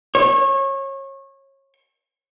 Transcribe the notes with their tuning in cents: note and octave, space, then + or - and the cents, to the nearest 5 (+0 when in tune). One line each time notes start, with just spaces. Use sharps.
C#5 -25